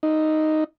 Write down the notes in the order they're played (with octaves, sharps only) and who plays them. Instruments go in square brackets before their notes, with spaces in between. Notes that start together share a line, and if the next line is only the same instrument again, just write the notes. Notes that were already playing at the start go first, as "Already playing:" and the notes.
[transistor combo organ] D#4